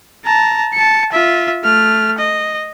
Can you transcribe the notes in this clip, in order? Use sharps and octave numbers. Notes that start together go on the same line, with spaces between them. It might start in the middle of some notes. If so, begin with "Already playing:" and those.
A5 A#5
A5 C#7
F4 E5
A3 F6
D#5